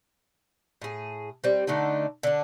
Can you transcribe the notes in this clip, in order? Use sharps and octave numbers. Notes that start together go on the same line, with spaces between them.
A2 G#4
G3 C4
D3 A3 D4 D#4
D3 D4